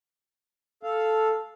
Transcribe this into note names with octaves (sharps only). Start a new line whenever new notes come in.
A4 F5